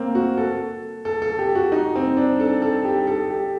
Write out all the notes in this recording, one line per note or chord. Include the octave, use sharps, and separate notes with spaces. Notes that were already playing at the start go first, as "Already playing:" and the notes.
Already playing: A3 A#3 C4
F#4
A4
A4
A4
G4
F#4
D#4
C4
D4
A4
A4
G4
A4
G4